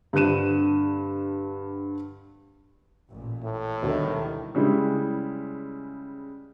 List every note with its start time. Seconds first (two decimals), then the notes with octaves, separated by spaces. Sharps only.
0.13 G2 D3 C4 F#6 D#7 E7
3.10 A1 A#2
3.43 A2
3.83 D2 B2 D3 D#3 G3
4.55 C#3 G3 G#3 E4